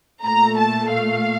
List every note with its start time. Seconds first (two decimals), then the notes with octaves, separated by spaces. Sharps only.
0.24 A#2 A3 A#5
0.59 A5
0.94 F5